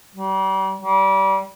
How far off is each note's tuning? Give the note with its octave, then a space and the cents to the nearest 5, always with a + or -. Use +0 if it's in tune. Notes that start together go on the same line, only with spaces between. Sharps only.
G3 -35
G3 -25